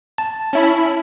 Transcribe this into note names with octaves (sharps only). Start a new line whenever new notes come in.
A5
C#4 E4 B5